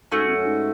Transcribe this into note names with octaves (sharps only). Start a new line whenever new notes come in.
G#2 A3 C#4 F#4
E2
F#2
G#2